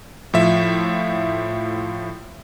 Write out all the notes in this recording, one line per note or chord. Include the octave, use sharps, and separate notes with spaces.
A2 F3 E5